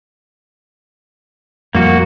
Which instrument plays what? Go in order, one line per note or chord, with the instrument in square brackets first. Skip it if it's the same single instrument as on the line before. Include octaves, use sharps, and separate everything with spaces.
[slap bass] F2 A2 G3 [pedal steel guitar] A#3 F#4